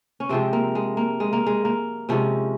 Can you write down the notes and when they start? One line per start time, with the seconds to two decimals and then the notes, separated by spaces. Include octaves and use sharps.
0.20 C#4
0.29 C3 F3 G#3 C4
0.53 A#3
0.75 G#3
0.97 A#3
1.20 G#3
1.33 A#3
1.46 G#3
1.65 A#3
2.09 C3 F3 G#3 C#4